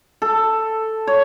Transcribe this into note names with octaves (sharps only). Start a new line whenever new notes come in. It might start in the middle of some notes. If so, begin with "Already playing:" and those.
A4
C#5